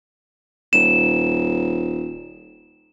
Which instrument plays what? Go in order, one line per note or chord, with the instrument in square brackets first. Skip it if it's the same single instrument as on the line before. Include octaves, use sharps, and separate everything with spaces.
[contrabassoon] D#1 [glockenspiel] E7